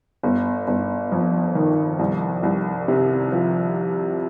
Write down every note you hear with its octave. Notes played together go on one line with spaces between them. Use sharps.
G1
G1
F2
D#3
C2
C2
C3
F3